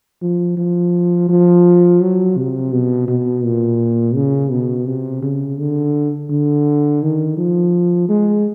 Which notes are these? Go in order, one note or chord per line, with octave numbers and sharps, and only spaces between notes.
F3
F3
F3
F#3
C3
B2
B2
A#2
C#3
B2
C3
C#3
D3
D3
D#3
F3
G#3